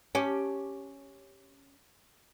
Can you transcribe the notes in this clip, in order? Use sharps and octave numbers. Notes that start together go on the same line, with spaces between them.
C#4 G4